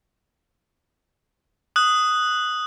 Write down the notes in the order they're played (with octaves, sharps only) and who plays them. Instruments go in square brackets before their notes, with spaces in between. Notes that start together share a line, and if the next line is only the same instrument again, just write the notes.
[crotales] D#6 F#6